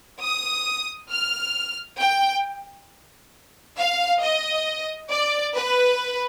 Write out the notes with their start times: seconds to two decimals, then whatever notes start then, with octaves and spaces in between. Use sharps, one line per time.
0.22 D#6
1.11 F6
2.00 G5
3.77 F5
4.21 D#5
5.10 D5
5.55 B4